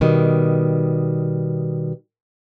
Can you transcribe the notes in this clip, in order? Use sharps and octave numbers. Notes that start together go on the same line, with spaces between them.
B2 D#3 G3